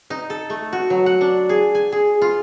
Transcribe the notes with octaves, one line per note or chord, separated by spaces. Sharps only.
D#4
A4
A3
F#4
F#3
F#5
D4
G#4
G#5
G#4
F4